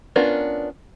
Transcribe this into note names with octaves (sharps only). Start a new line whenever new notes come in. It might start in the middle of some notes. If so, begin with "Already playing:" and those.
B3 C#4 D4 F4 A#4